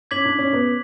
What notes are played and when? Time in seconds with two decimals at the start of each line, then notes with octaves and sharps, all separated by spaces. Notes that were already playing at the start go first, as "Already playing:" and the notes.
0.11 C#4 D6 G#6 B6 F#7
0.25 D4
0.39 C#4
0.53 B3